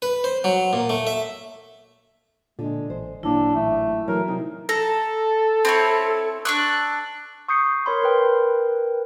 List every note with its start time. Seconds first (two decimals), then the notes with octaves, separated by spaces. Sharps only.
0.02 B4
0.24 C5
0.44 F#3
0.73 A#2
0.89 A3
1.07 E5
2.59 A#2 D3 G#3
2.90 A1 C5
3.23 G#1 F#2 A#2 D4 E4
3.55 A1 A3
4.08 E3 F#3 A3 A#4
4.28 C3 D#4
4.69 A4 A#5
5.65 C4 E4 C#5
6.45 D4 C#6 E6 F#6
7.48 C#6 D#6 G6 C7 C#7
7.86 A#4 C#5 B5 C6
8.02 A#4 B4 G5